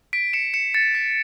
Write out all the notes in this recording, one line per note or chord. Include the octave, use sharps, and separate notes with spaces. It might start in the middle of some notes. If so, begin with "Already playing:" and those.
B6 D7
C#7 E7
C#7 E7
A6 C#7
B6